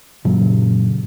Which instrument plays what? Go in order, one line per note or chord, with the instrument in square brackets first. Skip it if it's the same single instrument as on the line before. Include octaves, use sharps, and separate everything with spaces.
[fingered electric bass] F#2 A#2 C#3 F#3